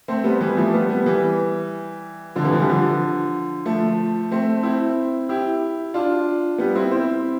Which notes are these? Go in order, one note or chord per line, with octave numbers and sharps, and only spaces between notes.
A3 C4
G3 B3
E3 G3
F3 A3
G3 B3
G3 B3
E3 G3
D3 F3
C3 E3
D3 F3
E3 G3
D3 F3
F3 A3
A3 C4
C4 E4
E4 G4
D4 F4
G3 B3
C4 E4
C4 E4